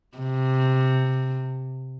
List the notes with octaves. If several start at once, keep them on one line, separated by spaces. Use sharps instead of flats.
C3